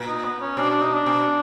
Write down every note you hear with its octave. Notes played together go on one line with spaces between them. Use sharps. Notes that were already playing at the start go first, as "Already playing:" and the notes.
Already playing: A#2
D#4
B3
C#4
B2 D4
D4
D#4
D4
B2